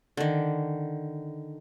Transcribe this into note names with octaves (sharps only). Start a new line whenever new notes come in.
D3 D#3